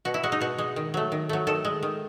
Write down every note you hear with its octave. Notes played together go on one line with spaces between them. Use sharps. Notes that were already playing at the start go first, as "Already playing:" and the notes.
B2 F#4
E4
G#3 F#4
D#4
B2 F#4
G#3
D#3
F#3 A3
D#3
F#3 A3
D#3 A4
G#3
D#3